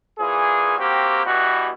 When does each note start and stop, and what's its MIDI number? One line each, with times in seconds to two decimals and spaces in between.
0.18 0.78 46
0.18 0.78 52
0.18 0.78 68
0.78 1.20 58
0.78 1.20 60
0.78 1.20 66
0.78 1.20 67
1.25 1.68 47
1.25 1.68 52
1.25 1.68 55
1.25 1.68 66